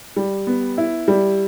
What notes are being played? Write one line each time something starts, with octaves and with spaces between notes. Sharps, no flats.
G3
B3
E4
G3